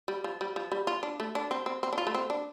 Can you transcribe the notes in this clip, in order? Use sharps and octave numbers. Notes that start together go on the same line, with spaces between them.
G3
F3
G3
F3
G3
F4
D4
A3
D4
C4
C4
C4
D4
F4
A3
C4
D4